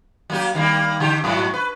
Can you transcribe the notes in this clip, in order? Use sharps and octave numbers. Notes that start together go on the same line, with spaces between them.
F#3 A#3 G4
D#3 G3 A#3
D3 G4
G#2 F#3 F#4
B4